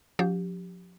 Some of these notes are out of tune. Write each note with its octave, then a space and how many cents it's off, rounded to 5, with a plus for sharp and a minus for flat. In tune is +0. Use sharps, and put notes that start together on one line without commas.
F3 +40 D4 -45 G4 +0